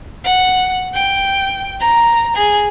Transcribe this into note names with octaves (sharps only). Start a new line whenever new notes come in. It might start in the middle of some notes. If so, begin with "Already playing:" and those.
F#5
G5
A#5
G#4